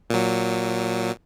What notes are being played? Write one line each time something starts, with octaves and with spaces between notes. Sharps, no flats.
A#2 F#3